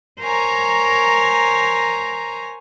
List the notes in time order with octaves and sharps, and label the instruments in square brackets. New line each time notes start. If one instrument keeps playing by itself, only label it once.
[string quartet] A#4 C5 C#5 G#5 A#5